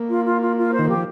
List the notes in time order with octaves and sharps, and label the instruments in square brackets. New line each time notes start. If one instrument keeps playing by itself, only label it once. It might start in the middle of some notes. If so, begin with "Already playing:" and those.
Already playing: [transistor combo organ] A#3
[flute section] F4
F4
F4
F4
C5
[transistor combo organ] D#3
[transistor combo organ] F3 [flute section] G4